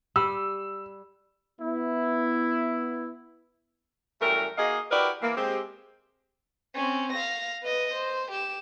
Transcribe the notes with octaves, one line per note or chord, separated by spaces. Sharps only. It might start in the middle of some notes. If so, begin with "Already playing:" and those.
G3 E6
B3 E4
F#2 E3 G3 A3 A#4
A#3 D#4 F#4 G#4 D#5 F5
E4 F#4 G4 A#4 B4 D5
E3 A#3
G#3 C4 G4
C4 C#4
F5 A#6
B4 D#5
C5
G4 E7